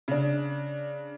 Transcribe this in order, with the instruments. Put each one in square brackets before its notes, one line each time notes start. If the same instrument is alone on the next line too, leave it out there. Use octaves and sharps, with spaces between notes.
[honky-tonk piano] C#3 D4